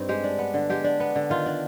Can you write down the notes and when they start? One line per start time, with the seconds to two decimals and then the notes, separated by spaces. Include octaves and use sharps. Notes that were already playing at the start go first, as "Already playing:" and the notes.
Already playing: G2 C4 D#4
0.09 G#3 G4
0.24 D4
0.39 B3
0.54 D3
0.70 G#3 G4
0.84 D4
1.00 B3
1.15 D3
1.30 D#3 F4
1.46 D4